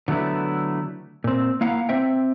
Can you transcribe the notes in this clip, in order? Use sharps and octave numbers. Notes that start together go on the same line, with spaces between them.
D3 F#3 A3 B3 E4
A#2 C4
A#3 E4 F5 F#5 A#5
C4 C5 E5 G5